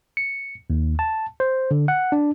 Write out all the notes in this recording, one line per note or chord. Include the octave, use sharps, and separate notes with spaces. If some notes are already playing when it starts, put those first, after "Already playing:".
C#7
D#2
A5
C5
D3
F#5
D4